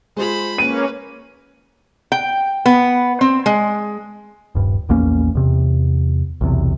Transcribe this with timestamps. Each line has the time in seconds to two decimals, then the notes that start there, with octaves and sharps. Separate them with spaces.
0.16 G#3 F4 G#4 C5 B5
0.58 A#3 C#4 B4 D#7
2.12 G5
2.66 B3
3.21 C4
3.46 G#3
4.55 D#1 G2
4.89 A#1 E2 A#3 C#4
5.35 E2 C3
6.41 B1 E2 C3